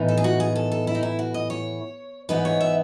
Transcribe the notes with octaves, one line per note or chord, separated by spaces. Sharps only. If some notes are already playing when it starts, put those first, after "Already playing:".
Already playing: A2 E3 B3 D#4
A4
G#4
F#4
G#4
A4
A4
E4
D#4
E4
F#4
D#5
C#5
G#2 E3 B3 D#4 B4
C#5
E5